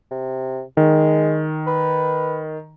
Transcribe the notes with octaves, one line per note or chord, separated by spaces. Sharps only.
C3
D#3 G#3
B4